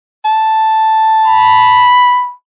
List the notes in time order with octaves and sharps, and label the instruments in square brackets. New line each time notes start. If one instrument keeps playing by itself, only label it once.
[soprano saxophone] A5
[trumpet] B5